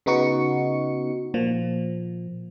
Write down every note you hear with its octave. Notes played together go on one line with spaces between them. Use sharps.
C#3 B3 D#4 F#4 C#6 C#7
A#2 F3